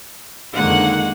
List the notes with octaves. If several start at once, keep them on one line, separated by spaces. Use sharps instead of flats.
F2 D3 D#3 G#3 A#3 F#5